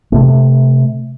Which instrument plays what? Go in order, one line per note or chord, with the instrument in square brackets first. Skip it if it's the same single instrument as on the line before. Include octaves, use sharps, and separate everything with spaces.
[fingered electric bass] C3 A3